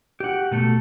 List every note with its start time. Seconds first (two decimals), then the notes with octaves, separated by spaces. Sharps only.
0.20 G4 F#5
0.51 B2 A3 A4